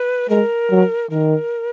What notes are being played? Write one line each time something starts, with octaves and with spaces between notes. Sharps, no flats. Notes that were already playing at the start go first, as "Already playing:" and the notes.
Already playing: B4
G#3 A#4
F#3
D#3 A#4